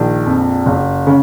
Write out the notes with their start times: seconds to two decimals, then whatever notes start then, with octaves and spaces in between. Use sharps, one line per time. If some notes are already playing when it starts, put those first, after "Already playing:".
Already playing: A#1 D#3
0.26 F2
0.66 F#1
1.07 C#3